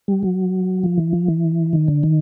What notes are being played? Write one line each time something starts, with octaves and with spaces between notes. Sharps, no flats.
G3
F#3
F3
E3
F3
E3
D#3
D3
D#3